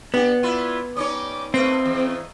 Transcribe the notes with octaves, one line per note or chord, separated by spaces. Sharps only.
B3 D4 G4
E4 F4 B4 D5 E5
G3 C#4 D#4 C#5 D6
A3 C4 D#4 E4 B4 F5
E2